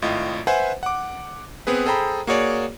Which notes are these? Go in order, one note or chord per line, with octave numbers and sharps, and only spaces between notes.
G#1 A2 F4 D#5
B4 C5 E5 F#5 G#5
F#5 D6
B3 C4 G#4 B4
G#4 A4 C5 G5 A#5 B5
A#3 F#4 G#4 C#5 D5